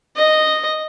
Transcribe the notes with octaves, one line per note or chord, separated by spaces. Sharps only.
D#5